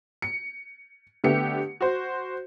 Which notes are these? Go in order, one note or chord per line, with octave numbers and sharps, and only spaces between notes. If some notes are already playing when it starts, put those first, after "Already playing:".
C#7
D3 A3 B3 G4 C#7
F#4 C5